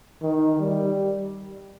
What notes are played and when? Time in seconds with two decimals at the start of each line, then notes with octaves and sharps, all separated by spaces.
0.22 D#3
0.59 G3